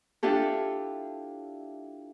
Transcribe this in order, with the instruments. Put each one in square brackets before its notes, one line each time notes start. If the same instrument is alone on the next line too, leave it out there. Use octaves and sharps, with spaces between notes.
[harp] D4 E4 F4 G4 A4